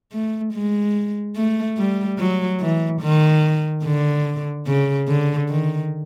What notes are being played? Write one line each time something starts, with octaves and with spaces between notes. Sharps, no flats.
A3
G#3
A3
G3
F#3
E3
D#3
D3
C#3
D3
D#3